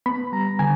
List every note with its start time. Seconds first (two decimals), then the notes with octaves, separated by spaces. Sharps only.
0.06 B3 B5
0.32 G3 A#5
0.59 D3 G#5